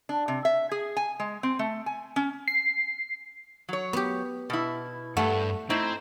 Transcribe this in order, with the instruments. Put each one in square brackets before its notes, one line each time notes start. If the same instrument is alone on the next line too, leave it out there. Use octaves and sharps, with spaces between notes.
[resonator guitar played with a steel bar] D4
C3
E5
G#4
G#5
G#3
C4
A3
G#5
C#4
[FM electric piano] C7
[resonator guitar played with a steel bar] F#3 C#5
[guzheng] B3 G4
[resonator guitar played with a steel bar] B2 E4
[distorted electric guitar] G2 [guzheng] A3 [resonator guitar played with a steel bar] F#5 A5
[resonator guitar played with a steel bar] A3 E4 [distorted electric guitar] C4 [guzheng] D#4